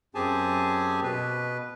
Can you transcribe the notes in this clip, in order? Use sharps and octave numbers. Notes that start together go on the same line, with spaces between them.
F#2 C4 G4 G#4 G#5 A5
B2 B4